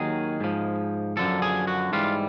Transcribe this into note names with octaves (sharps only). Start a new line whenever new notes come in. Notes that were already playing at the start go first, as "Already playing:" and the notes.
Already playing: D#2 D#3 F#3 G#4
G#2 F3
F#2 D3 F3 A4
G#4
F#4
G#2 E3 G3 F4